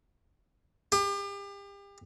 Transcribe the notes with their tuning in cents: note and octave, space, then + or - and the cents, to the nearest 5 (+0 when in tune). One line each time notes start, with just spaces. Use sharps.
G4 +35